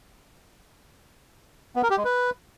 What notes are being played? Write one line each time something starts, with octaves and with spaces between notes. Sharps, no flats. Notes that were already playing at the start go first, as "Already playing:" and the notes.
B3
A#4
G4
G#3
B4